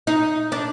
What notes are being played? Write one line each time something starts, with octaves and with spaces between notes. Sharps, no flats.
D#4
D4